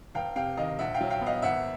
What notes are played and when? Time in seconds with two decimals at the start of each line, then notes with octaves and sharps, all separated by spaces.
0.15 F1 F5 G5
0.36 C3 F5 G5
0.57 D#3 D#5 F5
0.79 A#1 E5 F#5
0.94 F5 G5
1.01 F#3
1.10 F5 G5
1.21 B3
1.26 D#5 F5
1.42 G#1 E5 F#5